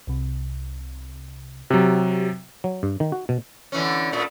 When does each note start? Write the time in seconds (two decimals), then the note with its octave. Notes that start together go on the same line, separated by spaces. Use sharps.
0.07 C2 C3
1.70 C3 F#3 G4
2.64 F#3
2.83 G2
3.00 D#3
3.12 F#4
3.29 B2
3.72 D3 E3 C#4
4.12 A#2 A3